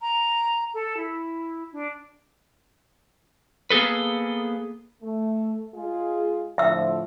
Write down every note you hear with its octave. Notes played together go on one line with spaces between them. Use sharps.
A#5
A4
E4
D4
A#3 B3 G#4 A4 B4
A3
G#3 F4 G#4
A2 D3 F3 E5 E6